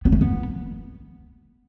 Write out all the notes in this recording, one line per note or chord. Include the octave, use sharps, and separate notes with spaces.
B3
A3
B3